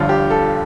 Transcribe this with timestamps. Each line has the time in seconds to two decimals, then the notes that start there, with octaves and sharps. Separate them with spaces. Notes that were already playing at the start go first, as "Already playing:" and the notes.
Already playing: G1 G2 D3 F3 F4
0.09 G4
0.30 A4